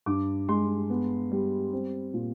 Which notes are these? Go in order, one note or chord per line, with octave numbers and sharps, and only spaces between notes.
G2 D6
G#3 C6
B3
G3
C4
A#2